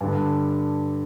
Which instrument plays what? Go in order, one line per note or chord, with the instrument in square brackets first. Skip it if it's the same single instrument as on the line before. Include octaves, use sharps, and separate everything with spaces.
[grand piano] G2 D3